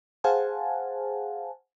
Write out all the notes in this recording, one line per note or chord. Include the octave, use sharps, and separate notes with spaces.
G#4 C5 F5 F#5 G#5 A5